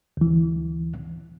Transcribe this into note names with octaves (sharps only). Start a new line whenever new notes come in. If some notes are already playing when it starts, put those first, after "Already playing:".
D2 E3